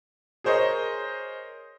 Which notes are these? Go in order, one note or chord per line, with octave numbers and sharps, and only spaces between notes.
G#4 A#4 C5 C#5 D#5